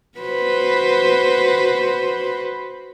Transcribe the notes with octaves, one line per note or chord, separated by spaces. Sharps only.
F#4 B4 C5